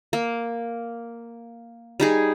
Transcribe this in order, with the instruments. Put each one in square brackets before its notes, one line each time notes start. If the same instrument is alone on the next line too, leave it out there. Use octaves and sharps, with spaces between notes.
[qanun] A#3
G3 D#4 G#4